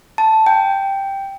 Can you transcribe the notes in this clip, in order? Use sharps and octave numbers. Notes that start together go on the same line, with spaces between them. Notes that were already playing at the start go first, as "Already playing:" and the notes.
A5
G5